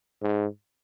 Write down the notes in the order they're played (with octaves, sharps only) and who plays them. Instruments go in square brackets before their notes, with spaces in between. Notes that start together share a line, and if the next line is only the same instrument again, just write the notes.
[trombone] G#2